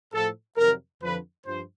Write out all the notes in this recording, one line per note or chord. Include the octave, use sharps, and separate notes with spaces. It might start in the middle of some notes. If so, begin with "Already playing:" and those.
A2 F3 A4
F2 C3 D#3 F#3 A#4
F2 D3 F3 B4
G2 F3 C5